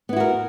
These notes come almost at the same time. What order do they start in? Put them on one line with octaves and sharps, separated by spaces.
B3 E4 F#4 A#4